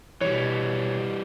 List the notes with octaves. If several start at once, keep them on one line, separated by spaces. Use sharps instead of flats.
B2 E3 G3 C#5